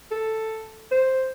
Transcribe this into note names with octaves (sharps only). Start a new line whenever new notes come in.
A4
C5